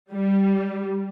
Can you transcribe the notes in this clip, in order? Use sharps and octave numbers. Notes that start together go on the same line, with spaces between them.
G3